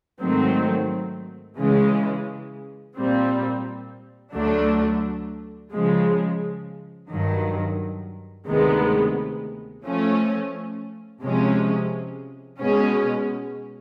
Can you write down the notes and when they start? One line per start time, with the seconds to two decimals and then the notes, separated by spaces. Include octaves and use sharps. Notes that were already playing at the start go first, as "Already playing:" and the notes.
0.20 G#2 D#3 F#3 A3 C4
1.58 C#3 E3 G#3 C#4
2.96 A#2 G3 C4
4.33 D2 D3 F#3 A3 D4
5.71 C#3 F3 G#3
7.10 G2 D#3 F#3
8.47 D2 C3 D#3 G#3 B3
9.84 F3 A3 C#4
11.22 C3 F3 G#3 C#4
12.60 B2 G#3 C#4